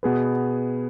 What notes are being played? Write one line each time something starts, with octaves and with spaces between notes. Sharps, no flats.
B2 B3 G#4 B4